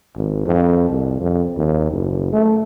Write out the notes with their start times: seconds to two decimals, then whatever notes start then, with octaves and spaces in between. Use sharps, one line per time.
0.17 G#1
0.46 F2
0.90 C2
1.20 F2
1.57 D#2
1.91 F#1
2.33 A3